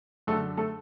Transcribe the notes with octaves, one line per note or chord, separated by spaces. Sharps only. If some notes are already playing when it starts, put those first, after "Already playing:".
F#2 D3 A3 A4
A3 A4